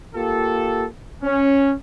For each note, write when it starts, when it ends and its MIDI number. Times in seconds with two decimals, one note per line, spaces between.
0.14 0.84 58
0.14 0.84 65
0.14 0.84 67
0.14 0.84 69
1.23 1.72 61